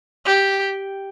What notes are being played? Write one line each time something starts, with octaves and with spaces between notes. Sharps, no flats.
G4